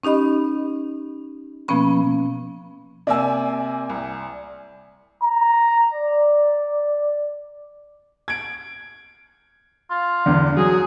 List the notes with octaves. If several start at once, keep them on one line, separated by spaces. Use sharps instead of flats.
C#4 D#4 G4 D#5 B5
B2 F3 A#3 B3 C#4 B5
C3 A#3 D5 G#5 E6
C2
A#5
D5
G#6 D7
F4
E2 D3
F#3 G#4